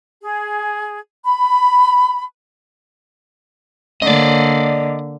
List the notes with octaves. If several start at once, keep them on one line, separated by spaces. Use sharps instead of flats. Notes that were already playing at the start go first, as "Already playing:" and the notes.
G#4
B5
D3 A#3 D5 D#5